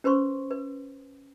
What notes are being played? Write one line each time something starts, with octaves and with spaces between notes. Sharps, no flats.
C#4 B4 C5 C6 C#6
B4